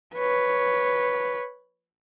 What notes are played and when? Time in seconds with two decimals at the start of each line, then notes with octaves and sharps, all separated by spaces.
0.15 B4 C#5